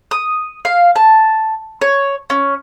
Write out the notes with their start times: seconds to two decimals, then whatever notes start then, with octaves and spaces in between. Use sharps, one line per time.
0.11 D#6
0.65 F5
0.96 A5
1.81 C#5
2.30 C#4